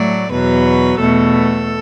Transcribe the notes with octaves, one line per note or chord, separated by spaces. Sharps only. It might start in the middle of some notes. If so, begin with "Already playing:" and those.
Already playing: A2 F#3 A3 D5
E2 B2 F#3 B4
E2 B2 A3 A4